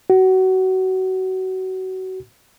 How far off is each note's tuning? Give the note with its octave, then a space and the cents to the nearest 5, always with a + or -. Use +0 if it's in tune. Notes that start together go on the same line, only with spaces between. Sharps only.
F#4 +25